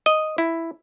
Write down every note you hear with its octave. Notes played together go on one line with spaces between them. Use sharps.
D#5
E4